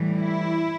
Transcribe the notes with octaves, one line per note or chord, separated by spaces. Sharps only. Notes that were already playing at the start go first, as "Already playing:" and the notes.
Already playing: A2 E3 G3
E4